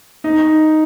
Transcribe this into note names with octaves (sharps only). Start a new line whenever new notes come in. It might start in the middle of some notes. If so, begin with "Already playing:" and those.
D#4